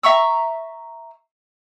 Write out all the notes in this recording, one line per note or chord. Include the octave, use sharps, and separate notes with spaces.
E5 A#5 C#6 E6